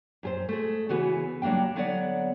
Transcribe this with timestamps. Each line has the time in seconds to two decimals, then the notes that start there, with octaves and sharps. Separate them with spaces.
0.23 F#2 G#4 C5
0.49 A3 G#4
0.89 C#3 E3 B3 F#4 G#4 B4
1.42 F#3 G3 A#3 D4 G5
1.75 D3 F#3 B3 C#5 D5 F#5